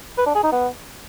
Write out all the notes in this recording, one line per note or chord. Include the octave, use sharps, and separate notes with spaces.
B4
D4
G#4
D#4
B3